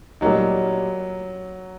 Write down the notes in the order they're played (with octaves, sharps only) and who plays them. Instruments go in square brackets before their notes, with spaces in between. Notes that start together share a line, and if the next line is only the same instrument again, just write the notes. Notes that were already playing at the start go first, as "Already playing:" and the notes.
[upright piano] A#2 G3 A#3 D#4 [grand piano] F#3